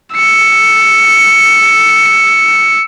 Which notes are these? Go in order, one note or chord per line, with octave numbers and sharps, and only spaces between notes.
E6 C#7